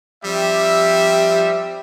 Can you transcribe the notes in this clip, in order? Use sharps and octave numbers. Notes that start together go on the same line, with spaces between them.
F3 G3 C4 G4 E5